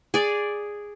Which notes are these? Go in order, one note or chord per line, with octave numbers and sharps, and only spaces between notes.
G#4 D5